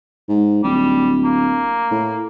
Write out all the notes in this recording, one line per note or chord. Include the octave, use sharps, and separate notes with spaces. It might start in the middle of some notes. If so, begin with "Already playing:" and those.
G#2
D1 G3
A#3
A2